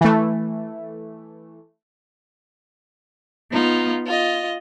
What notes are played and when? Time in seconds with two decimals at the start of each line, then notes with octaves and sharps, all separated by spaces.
0.01 E3 A3
3.51 B3 D#4 F4
4.06 F4 D#5